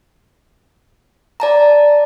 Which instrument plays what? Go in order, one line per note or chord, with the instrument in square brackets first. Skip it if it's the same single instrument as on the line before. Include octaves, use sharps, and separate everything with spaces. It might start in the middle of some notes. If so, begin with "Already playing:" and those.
[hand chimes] D5 A5 A#5